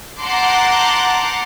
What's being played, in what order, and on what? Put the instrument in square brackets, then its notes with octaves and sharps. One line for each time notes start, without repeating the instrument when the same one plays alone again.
[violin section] F#5 A5 A#5 C6 D6 G6